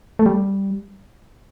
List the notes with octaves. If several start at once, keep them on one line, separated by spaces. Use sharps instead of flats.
A3
G3